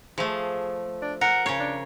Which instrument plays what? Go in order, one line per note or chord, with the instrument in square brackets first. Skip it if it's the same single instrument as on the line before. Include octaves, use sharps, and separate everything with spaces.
[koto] F3 A3 [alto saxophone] G#4
[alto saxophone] D4
[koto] A#4 [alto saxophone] F#5
[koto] C#3 C#5
[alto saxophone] D4